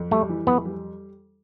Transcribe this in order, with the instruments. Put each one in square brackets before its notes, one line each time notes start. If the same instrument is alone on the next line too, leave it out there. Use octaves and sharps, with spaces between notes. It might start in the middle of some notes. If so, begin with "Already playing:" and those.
Already playing: [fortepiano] F2
[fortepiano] G3 [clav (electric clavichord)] A3
[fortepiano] E3
[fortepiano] F2 [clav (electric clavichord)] B3
[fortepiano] G3